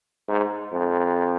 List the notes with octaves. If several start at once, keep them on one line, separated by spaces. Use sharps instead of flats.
G#2
F2